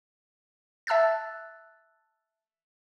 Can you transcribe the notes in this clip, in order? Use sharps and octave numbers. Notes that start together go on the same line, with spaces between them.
E5 A5 E6 F#6 A6